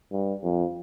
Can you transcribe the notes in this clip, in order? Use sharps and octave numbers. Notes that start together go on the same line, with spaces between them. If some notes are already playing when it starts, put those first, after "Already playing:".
G2
F2